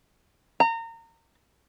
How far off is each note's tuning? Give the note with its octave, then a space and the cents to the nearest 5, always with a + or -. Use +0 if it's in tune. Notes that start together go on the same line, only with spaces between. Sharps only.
A#5 -30